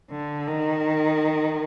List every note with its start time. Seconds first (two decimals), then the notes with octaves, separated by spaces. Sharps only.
0.11 D3
0.47 D#3